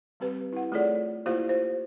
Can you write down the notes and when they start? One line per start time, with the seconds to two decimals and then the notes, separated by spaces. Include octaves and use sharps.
0.20 G3 C4 G4 B4
0.53 E4 F#5
0.72 A3 F4 G#4 A4 C#5 D5
1.26 A#3 E4 F4 G4 C5 F5
1.49 C5